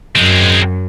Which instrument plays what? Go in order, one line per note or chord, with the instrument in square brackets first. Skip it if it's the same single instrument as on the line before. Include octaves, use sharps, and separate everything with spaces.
[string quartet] F#2 [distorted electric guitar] G#3 C4